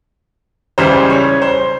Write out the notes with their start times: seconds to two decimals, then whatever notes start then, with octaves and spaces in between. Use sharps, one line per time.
0.78 C#2 C#3 E3 G3 C5
1.10 C#5
1.42 C5